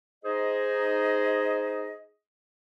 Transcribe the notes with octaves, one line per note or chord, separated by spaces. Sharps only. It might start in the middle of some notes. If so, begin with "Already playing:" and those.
D#4 G#4 C5 D#5